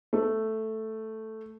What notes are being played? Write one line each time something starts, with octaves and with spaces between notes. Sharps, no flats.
A3